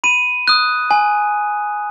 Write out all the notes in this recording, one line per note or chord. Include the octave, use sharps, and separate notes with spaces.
B5 D#7
D#6 F#6
G#5